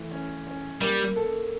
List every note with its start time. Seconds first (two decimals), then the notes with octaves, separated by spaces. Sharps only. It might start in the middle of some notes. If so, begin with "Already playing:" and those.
Already playing: E3 A3
0.11 C#4
0.47 C#4
0.81 G3 A#3
1.16 A4